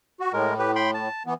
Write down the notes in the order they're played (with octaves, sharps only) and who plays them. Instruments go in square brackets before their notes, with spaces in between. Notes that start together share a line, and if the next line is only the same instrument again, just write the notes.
[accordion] F#4
[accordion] A2 [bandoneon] G#3 A#4
[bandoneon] G4 B4
G5 B5 C6
A5
[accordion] E3 B3